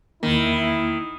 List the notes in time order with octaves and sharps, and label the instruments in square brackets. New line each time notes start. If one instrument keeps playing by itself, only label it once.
[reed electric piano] E2 A#3 [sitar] D#3 [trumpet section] E4